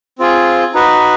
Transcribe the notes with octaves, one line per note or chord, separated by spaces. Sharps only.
C4 F4 G#4
D#4 F#4 B4